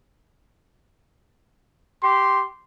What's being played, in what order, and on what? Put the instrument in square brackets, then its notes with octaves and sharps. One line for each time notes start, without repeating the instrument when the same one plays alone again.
[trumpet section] G4 C6